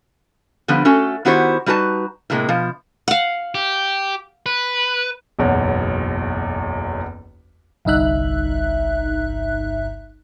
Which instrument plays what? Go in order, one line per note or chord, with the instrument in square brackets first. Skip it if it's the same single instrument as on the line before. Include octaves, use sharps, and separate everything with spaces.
[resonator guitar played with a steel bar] D3 F3 G3 B3
A3 C#4 F#4 A4
D#3 B3 E4 F#4 G4 C5
G3 D#4 F#4 B4 A5
A2 C3 G#3 A#3
B2 F3
[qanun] F5 F#5
[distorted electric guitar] G4
B4
[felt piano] F#1 B1 E2 C#5 F#5
[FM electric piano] G1 C2 G2 D#4 E5 F#6